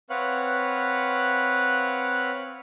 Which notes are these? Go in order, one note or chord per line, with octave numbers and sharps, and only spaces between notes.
C4 B4 C#5 F5 F#5 F#6